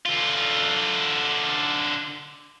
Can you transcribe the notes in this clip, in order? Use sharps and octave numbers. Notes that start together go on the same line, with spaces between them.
D3 F4